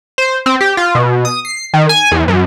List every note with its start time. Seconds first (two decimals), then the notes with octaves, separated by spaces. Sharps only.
0.18 C5
0.46 C4
0.61 G4
0.77 F4
0.95 B2
1.25 D#6
1.45 C7
1.74 D#3
1.89 G#5
2.12 E2
2.28 F#2